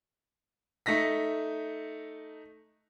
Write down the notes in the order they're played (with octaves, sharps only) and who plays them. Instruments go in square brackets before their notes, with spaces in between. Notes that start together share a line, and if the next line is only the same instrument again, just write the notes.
[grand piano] A3 D#4 A#6 B6